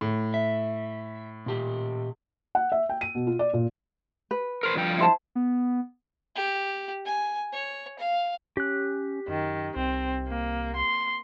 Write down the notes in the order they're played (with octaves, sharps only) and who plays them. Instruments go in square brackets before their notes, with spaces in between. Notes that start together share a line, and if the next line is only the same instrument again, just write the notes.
[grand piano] A2
[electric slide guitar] E5
A#2 G4
[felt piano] F#5
E5
G5
D#7
B2
F4
D5
A#2
[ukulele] B4
[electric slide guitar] A#4 C5
G2 F3 G5
[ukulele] E4 C5 A5
[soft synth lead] B3
[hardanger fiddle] G4
G#5
C#5
F5
[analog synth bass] C#4 [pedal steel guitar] G4 F#6
[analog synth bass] F#2 [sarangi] D#3
[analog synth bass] C2 [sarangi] C4
[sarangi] A#3
C6